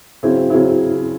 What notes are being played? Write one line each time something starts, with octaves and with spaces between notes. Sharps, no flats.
C#3 F#3 C4 E4
C#3 F#3 C4 E4